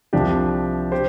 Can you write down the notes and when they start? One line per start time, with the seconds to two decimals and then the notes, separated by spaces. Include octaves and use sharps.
0.13 C2 C3 F3 D4 G4
0.92 G4 C5